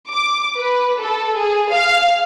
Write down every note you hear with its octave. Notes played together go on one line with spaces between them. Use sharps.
D6
B4
A4
G#4
F5